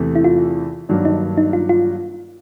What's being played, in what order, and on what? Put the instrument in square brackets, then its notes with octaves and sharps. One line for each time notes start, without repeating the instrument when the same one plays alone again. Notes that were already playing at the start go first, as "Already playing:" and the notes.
Already playing: [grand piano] E2 C3 E3 A3
[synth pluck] E4
F4
[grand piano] G2 D#3 F#3 A#3 D4
[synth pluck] D#4
D#4
F4
F4